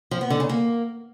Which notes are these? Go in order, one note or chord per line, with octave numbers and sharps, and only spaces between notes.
F3
B3
D3
C#3
A#3